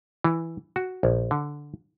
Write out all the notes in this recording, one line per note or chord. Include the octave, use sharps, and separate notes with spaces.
E3
F#4
A#1
D3